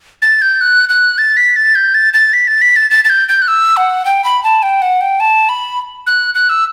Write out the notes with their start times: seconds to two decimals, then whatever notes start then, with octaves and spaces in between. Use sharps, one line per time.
0.22 A6
0.42 G6
0.61 F#6
0.89 F#6
1.18 A6
1.37 B6
1.56 A6
1.75 G6
1.94 A6
2.14 A6
2.33 B6
2.47 A6
2.62 B6
2.76 A6
2.91 A6
3.05 A6
3.10 G6
3.29 G6
3.42 F#6
3.48 E6
3.77 F#5
4.05 G5
4.24 B5
4.44 A5
4.63 G5
4.82 F#5
5.01 G5
5.20 A5
5.49 B5
6.07 F#6
6.35 F#6
6.49 E6